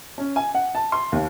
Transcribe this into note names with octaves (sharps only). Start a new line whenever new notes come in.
C#4
G#5
F#5
A5
C6
D#2